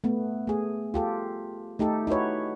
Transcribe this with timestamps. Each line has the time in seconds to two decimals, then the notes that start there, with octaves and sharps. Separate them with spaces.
0.04 A3 B3
0.47 A3 G#4
0.94 F4 G4 A4
1.79 A3 D#4 G4 A4
2.07 D#4 E4 F#4 B4 C#5